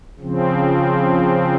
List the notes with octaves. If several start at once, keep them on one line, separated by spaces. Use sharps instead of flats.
C#3 F3 C4